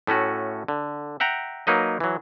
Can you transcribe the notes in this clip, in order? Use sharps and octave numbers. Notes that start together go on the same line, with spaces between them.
A2 A3 C#4 F#4
D3
E5 F#5 G5 A#5
F#3 A#3 D#4 B4 D#5
E3 F#3